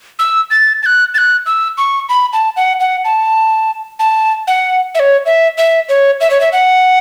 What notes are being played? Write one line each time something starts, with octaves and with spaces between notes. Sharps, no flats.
E6
A6
A6
F#6
A6
F#6
E6
C#6
B5
A5
F#5
F#5
A5
A5
F#5
E5
C#5
E5
E5
C#5
E5
C#5
E5
F#5